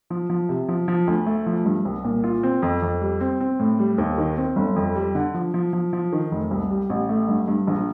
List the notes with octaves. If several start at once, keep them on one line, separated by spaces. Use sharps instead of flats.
F3
F3
C3
F3
F3
D2
A3
F3
G2
C2
A#2
F4
C4
F2
F2
G3
C4
C4
A2
G3
D#2
D#3
C4
G1
F2
G3
D3
F3
F3
F3
F3
D#3
F1
C2
G3
A1
A3
G2
G2
A#1